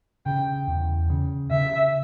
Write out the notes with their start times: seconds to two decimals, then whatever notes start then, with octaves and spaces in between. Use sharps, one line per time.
0.26 C#3 G5
0.68 E2
1.10 C#3
1.51 C#3 E5